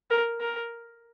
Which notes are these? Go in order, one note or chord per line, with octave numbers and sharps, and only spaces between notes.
A#4
A#4